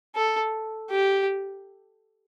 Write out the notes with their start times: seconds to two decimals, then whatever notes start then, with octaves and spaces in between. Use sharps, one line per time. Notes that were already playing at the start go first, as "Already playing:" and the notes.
0.16 A4
0.91 G4